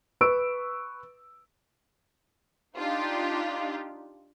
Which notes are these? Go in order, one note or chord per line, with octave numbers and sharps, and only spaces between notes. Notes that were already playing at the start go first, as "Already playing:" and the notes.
B4 C#6 E6 D7
D4 D#4 F4 G4